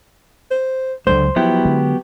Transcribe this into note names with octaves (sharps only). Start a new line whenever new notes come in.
C5
C#2 D3 F#3 G#3 C5
F3 F#3 B3 E4 G4
D3 G#3